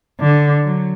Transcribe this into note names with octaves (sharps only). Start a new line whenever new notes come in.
D3
F#3